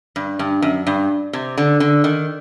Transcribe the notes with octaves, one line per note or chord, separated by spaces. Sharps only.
G2
G2
F#2
G2
C3
D3
D3
D#3